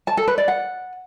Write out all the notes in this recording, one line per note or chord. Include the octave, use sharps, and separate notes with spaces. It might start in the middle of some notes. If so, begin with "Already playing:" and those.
A5
A4
B4
D5
F#5